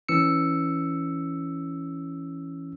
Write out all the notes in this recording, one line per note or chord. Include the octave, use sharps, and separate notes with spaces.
E3 C#4 E6 C#7